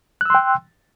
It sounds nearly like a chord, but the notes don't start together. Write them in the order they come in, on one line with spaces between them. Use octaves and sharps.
F#6 E6 C6 G5